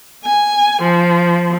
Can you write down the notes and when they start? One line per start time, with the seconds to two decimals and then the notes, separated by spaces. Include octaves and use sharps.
0.23 G#5
0.80 F3